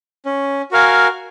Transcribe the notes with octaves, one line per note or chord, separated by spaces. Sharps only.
C#4
F#4 A#4 F5 G#5